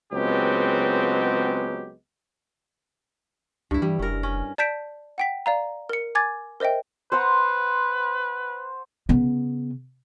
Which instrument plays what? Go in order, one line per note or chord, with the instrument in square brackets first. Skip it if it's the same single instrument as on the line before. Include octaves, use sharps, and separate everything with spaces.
[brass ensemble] C#2 F#3 G#3 B3 C4 G4
[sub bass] C#2 [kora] G2 E4
[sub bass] E3 [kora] G3
[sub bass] F1 [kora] C#4 A#4
[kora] C#4
[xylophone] D5 A5 G6 B6 D7
F#5 G5 B6
D5 F5 A#5
A#4 C#7
G#5 D6 G#6 A6
A#4 C5 D#5 E5 G5
[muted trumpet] B4 [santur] C5 F#5 A#5
[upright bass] C#3 B3